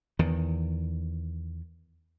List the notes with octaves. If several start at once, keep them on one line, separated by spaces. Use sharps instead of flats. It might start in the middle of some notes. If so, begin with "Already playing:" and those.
E2 D#3